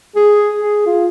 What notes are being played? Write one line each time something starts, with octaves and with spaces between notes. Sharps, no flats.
G#4
G#4
F4